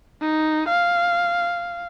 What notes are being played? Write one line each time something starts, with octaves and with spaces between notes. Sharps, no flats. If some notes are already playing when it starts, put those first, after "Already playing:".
D#4
F5